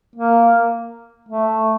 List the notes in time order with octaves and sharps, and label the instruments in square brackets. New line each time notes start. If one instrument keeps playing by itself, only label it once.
[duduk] A#3
A3